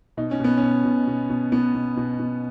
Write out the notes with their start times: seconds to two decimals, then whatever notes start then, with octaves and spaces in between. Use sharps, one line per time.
0.17 B2 D#4
0.31 C#4
0.40 B2 B3
0.57 C#4
0.63 B2
0.85 B2
1.07 B2
1.30 B2
1.52 B2 B3
1.75 B2
1.97 B2
2.19 B2